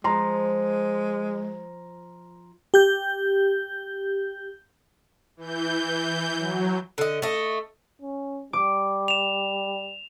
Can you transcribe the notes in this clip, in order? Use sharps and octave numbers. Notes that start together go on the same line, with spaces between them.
F3 G#3 A#5 C6
G4 G6
E3 G6
F#3
D3 D#5
A3 D#5
C#4
G3 D6
E7 F7